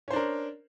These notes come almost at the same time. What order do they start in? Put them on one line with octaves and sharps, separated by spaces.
C#4 C5 D4 A#4